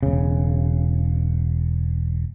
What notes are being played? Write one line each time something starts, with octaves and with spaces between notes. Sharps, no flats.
E1 C#3